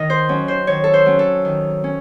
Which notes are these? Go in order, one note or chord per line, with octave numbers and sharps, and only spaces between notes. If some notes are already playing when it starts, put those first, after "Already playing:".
Already playing: D#3 D#5
C5
F#3 C#4
C5
D#3 C#5
A4
C5
F#3 C#4
A4
D#3
C#4